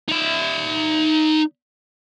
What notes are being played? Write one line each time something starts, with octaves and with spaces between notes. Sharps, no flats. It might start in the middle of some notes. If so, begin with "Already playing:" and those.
D#4 E5